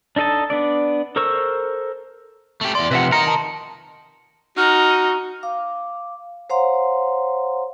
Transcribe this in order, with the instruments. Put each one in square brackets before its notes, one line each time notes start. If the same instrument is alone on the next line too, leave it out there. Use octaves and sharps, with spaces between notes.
[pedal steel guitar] D4 D#4 A4 D#5 A5
B3 D4 D5
A4 A#4 C5 C#6 E6
[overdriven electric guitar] A3 G4
[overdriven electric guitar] E2 D5 [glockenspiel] C6
[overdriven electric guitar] C3 F3 [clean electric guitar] B4 E5 F#5
[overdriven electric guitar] A#4 D#5 [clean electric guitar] A#5 [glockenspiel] C#7
[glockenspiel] A5
[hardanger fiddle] D#4 [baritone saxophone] F#4 [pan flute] F6
[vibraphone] F5 D6
C5 C#5 F5 F#5 A#5 C6